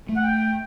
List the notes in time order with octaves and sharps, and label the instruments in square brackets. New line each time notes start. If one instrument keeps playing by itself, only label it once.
[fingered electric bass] A3
[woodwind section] F#5
G5